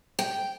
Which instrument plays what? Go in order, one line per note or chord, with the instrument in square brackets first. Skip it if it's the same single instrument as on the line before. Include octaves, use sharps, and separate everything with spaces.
[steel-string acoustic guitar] G5